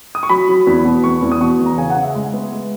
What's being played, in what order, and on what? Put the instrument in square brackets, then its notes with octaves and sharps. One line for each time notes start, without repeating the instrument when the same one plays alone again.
[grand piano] D#6
C#6
F#3 B5
F#3
E2
B2
E2 C#6
E2
D#6
B2 C#6
E2
A#5
C#3 G#5
F#5
C#3
E5
G#3
B3
G#3